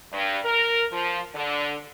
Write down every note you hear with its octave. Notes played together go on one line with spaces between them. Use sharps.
G2
A#4
F3
D3